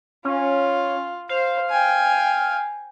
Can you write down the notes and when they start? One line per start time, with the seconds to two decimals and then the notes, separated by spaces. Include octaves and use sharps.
0.25 C#4 F4
1.29 C5 F5
1.70 G5 G#5